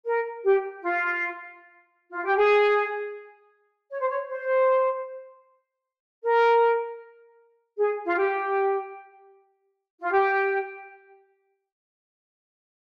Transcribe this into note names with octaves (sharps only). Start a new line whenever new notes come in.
A#4
G4
F4
F4
G4
G#4
C#5
C5
C#5
C5
A#4
G#4
F4
G4
F4
G4